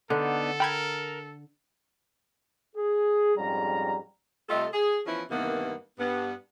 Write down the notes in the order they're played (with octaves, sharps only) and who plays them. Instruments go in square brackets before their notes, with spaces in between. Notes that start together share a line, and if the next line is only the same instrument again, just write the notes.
[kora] D3 [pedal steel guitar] B3 D4 D#4 [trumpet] A4
[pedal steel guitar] A#4 [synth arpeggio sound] G5 B5 G#6
[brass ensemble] G#4
F2 G#2 G3 C#4 A#5
[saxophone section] C3 G3 A3 F4 A4 D#5
G#4
E3 F3 B3 C#4 E4
G2 C3 D#3 E3 A#3 B3
G2 B3